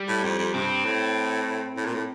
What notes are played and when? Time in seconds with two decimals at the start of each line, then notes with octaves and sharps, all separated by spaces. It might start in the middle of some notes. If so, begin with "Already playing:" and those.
Already playing: G3
0.08 A2
0.23 F2
0.39 F2
0.54 G2 C4
0.85 A2
1.77 A2
1.85 A#2
1.94 A2